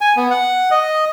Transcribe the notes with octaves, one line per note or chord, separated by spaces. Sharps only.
G#5
B3
F#5
D#5